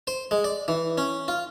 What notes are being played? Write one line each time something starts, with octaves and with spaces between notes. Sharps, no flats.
C5
G#3
D5
E3
C#4
F4